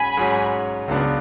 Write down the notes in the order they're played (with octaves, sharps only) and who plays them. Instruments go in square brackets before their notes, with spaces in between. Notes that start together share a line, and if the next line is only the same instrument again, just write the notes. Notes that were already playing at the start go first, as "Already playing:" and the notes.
Already playing: [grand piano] G#2 F#3 C#4 [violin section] G#5 B5
[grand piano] G#2 F#3 C#4
C#2 C#3 F#3 B3 D4